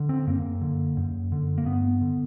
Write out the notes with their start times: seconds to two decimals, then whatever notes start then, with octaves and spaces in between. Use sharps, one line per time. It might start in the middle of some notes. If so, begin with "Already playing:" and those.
Already playing: D3
0.09 C4
0.27 F#2 A#3
0.61 D3
0.97 F#2
1.32 D3
1.58 A#3
1.65 G2 B3
2.01 D3